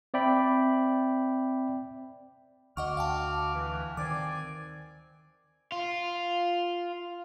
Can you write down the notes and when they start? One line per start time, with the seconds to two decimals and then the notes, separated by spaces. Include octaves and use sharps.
0.14 C4 D5 E5 G5 B5
2.77 D2 F#4 D#5 F#5 C#6 D6 F6
2.97 F5 G5 A5
3.54 E3
3.97 D#3 C4 D5 G#5 D6
5.72 F4